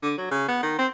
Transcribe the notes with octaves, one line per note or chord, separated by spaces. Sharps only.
D3
F#3
C#3
B3
D#3
C4